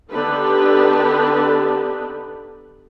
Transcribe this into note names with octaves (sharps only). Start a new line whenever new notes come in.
D3 B3 D4 D#4 G4 B4